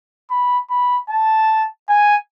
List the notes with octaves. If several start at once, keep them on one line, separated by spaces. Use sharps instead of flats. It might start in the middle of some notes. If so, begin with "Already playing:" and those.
B5
B5
A5
G#5